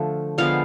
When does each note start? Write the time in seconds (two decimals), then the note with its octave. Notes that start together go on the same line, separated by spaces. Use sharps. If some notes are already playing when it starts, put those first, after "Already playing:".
Already playing: D3 F3 A3
0.38 D3 F3 G#3 B3 F5